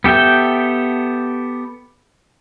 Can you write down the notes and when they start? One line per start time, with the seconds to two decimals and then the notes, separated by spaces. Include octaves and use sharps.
0.04 B3 G4 A4 E5 G5